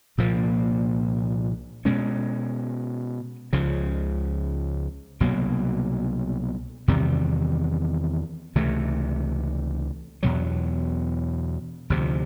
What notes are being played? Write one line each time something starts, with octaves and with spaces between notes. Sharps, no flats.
C2 A#2 F3 A#3
B2 G#3 C#4
C#2 C#3 F3
C2 B2 F#3 A#3
E2 C3 D#3 G3
C#2 C3 E3 A3
E2 B2 F#3
D2 C3 F3